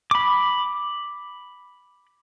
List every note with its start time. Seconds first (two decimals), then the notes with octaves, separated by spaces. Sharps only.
0.11 B5 D6